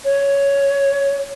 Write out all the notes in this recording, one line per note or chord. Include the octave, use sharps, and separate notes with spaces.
C#5